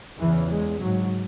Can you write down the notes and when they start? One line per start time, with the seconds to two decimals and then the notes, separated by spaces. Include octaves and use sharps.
0.19 E2 C#3 E3
0.50 G#3
0.81 G#2 F#3